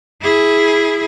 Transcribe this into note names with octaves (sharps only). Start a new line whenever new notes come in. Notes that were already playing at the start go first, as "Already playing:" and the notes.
E4 G#4